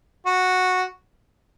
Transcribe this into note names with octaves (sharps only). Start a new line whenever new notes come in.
F#4